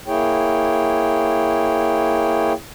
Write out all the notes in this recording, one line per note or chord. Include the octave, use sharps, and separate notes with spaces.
A#3 E4 G#4 C#5 G5